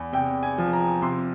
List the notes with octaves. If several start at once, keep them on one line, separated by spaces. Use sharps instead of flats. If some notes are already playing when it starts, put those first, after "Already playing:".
Already playing: E2
C3 G5
G#5
F3
A#5
C3 C6